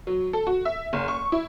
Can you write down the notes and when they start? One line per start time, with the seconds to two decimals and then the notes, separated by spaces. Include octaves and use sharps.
0.07 F#3
0.33 A4
0.47 F#4
0.65 E5
0.93 F#1
1.08 C#6
1.32 E4